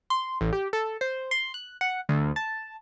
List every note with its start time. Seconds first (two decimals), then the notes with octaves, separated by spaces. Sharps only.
0.10 C6
0.41 A1
0.53 G4
0.73 A4
1.01 C5
1.31 C6
1.54 F#6
1.81 F#5
2.09 D2
2.36 A5